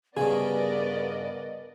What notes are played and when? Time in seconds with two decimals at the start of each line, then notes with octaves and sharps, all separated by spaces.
0.17 G2 C#3 B3 G#4 A#4 D5 D#5